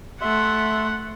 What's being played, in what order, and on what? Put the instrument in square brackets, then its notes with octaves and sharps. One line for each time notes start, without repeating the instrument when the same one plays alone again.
[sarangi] A3 [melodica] E5 C6 [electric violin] F#5